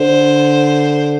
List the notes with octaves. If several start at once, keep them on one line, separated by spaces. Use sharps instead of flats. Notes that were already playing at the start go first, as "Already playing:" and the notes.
Already playing: D3 C5